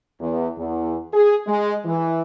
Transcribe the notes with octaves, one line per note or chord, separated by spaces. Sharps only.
E2
E2
G#4
G#3
E3